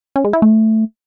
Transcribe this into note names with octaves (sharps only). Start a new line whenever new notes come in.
C#4
G#3
E4
A3